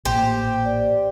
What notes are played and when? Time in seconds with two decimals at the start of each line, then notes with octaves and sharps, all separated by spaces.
0.05 A1 A#2 G4 C5
0.65 D5